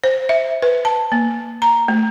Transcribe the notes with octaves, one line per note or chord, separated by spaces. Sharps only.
C5
E5
B4
A5
A#3
A#5
A3